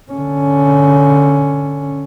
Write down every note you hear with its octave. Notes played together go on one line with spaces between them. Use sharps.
D3 C#4